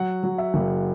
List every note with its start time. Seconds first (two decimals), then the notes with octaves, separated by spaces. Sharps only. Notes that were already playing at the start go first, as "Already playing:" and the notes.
Already playing: F#3 F#5
0.23 F#3
0.38 E5
0.54 F#1